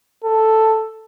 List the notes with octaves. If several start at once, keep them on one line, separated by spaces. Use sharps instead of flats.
A4